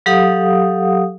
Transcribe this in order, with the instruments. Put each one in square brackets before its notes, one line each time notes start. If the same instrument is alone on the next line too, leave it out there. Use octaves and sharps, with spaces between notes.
[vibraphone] F#3 G4 A4 F5 F#5 D#6